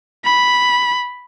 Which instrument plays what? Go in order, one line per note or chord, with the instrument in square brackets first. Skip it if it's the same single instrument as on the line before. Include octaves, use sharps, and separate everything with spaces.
[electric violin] B5